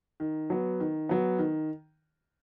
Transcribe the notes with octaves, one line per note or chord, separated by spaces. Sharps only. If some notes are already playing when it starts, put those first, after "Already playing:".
D#3
F#3 B3
D#3
F#3 B3
D#3